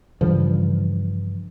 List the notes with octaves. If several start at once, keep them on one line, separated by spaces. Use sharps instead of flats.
G2 C#3 E3 F3